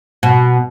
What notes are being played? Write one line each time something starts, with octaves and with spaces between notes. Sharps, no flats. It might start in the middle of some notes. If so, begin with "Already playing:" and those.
B2